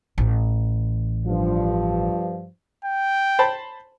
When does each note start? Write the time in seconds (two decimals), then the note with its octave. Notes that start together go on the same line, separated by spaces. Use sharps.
0.18 A1
1.26 G2 F3
2.85 G5
3.39 C5 A5 B5